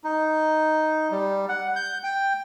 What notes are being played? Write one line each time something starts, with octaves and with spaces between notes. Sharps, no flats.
D#4
G3
F#5
G6
G5